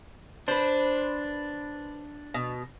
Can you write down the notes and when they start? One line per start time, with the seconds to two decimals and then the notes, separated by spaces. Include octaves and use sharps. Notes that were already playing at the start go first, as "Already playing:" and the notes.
0.48 D4 B4 C5
2.34 B2